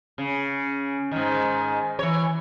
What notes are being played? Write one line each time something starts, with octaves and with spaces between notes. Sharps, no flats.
C#3
G#2 D#3
E3 C#5